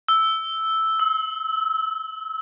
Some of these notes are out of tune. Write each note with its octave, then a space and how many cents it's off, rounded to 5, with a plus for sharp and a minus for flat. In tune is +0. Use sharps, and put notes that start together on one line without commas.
E6 -5
E6 -35